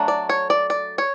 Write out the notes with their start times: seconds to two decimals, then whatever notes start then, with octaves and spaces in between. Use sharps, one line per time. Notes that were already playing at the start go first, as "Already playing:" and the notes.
Already playing: F#3 A3 D4
0.08 D5
0.29 C#5
0.50 D5
0.70 D5
0.98 C#5